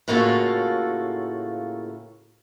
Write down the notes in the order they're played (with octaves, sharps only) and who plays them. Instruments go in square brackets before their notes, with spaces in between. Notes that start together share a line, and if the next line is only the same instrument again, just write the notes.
[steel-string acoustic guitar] A2 C#3 A#3 F4 F#4 A4